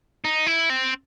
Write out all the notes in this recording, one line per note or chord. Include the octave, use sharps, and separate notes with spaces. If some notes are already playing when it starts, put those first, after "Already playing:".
D#4
E4
C4